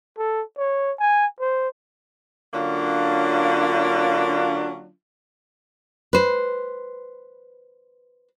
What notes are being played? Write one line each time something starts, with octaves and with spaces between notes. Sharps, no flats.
A4
C#5
G#5
C5
D3 F#3 A#3 C#4 D4 F4
B4 C5